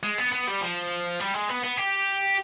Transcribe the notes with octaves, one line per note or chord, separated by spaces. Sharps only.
G#3
B3
B3
G3
F3
G3
G#3
B3
B3
G4